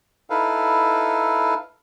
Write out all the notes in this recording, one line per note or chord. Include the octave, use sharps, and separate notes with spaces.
D#4 E4 A4 B4 F5